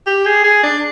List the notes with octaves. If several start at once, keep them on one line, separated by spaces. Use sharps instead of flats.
G4
G#4
G#4
D4